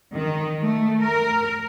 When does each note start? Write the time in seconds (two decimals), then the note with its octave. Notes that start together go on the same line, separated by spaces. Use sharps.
0.14 D#3
0.62 A3
1.01 A#4